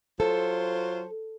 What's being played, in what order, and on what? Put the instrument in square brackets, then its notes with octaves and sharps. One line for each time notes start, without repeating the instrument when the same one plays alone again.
[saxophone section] F#3 F4 C5 [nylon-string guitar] A4